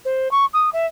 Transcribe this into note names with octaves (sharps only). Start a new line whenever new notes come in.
C5
C#6
D#6
E5